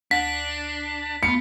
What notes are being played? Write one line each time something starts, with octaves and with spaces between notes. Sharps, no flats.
D2 D4 B6
A3 B3 F4 C#7